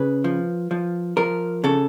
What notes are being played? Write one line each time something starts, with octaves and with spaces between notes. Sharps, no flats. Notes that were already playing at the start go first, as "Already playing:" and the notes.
Already playing: C#3 B4
F3
F3
F3 A#4
C#3 A4